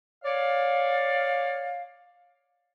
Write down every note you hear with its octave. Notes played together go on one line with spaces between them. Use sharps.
C#5 D5 F5